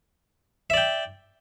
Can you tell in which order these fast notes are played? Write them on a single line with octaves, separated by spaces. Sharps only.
E5 D5 G5